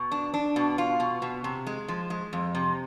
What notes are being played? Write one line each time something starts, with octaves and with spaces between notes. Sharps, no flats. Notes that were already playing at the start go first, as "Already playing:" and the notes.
Already playing: B2
D4
D4
B2
F4
B2
B2
C3
G#3
F3
G#3
F2
C3